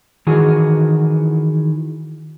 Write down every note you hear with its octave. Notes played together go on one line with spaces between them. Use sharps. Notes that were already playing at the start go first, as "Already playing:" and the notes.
D#3 E3 F#4 G#4